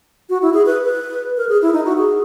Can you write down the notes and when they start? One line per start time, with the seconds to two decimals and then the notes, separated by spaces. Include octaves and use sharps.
0.29 F#4
0.42 E4
0.54 G#4
0.66 B4
0.84 B4
1.37 A#4
1.49 G#4
1.62 E4
1.73 D#4
1.85 F#4
1.98 G#4